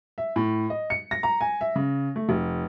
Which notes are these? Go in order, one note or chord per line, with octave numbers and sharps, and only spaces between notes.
E5
A2
D#5
C#7
A#6
A#5
G#5
E5
C#3
A3
F1